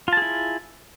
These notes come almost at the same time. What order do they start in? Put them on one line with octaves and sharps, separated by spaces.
F4 A5 G#4 E4